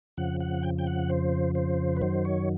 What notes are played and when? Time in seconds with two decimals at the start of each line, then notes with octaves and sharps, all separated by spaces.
0.17 F2 C#3 F3 F#5
0.40 F#5
0.63 G5
0.79 G5
0.87 F#5
1.10 C5
1.55 C5
1.97 B4
2.01 F#2 D#3 F#3 C5
2.25 C#5